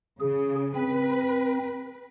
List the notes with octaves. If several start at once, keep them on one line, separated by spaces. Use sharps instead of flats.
C#3 G#4
C4 B4